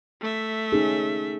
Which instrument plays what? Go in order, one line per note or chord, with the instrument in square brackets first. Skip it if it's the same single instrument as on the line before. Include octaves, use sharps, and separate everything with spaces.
[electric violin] A3 E5
[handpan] C#4 D#4 G#4